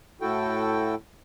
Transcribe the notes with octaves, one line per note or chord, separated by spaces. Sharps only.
A2 E4 F#4 A4 G5